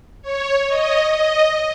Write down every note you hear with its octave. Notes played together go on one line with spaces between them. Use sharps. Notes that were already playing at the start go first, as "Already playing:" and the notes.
C#5
D#5
D#5